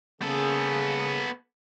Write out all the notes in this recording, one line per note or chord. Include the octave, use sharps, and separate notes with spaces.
C#3 A#3 B3 G#4 A4